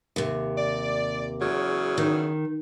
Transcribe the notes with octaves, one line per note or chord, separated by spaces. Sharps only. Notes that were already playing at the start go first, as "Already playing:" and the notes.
D#2 C3
D5
E2 C#3 F#3
D#3